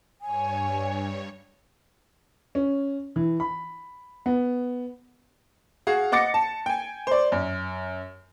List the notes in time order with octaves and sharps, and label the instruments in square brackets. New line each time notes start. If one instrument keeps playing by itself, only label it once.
[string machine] G2 C#5 [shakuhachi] G#5
[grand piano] C#4
E3
B5
B3
[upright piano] F#4 G#4 F5
D#5 F#5 D6 A6 A#6 C#7
A5
G5 G#5
C5 D5
F#2